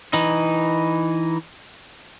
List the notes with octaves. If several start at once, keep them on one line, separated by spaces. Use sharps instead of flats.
E3 D#4